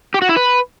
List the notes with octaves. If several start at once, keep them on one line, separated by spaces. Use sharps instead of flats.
G4
F#4
E4
B4